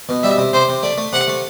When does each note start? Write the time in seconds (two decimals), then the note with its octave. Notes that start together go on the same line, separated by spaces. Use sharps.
0.09 B2
0.23 G3 E5
0.38 C3
0.53 C3 C5
0.69 C3
0.83 A3 D5
0.98 A3
1.13 C3 F#5
1.28 A3